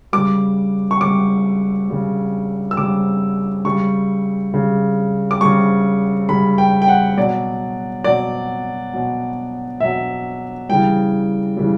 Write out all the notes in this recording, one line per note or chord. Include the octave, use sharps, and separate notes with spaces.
C#3 G3 D6
C#6
C#3 G3 D6
C#3 G3
E6
C#3 G3 D6
C#3 G3 C#6
C#3 G3
D6
C#3 G3 C#6
C#3 G3 B5
G5
G5
F#5
B2 F#3 D5
B2 F#3 D5
B2 F#3
B2 F#3 E5
C#3 E3 G3 G5
C#3 E3 G3